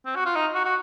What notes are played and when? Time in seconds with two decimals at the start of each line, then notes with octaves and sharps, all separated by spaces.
0.06 C4
0.15 F#4
0.26 F4
0.35 D#4
0.55 F#4
0.65 F#4